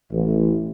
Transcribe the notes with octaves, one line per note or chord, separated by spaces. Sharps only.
A1